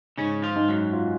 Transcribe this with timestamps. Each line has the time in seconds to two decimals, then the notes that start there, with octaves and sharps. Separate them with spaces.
0.17 G#2 C#3 C#4
0.42 F3 F4
0.55 G#2
0.68 F#2 F#3
0.93 F4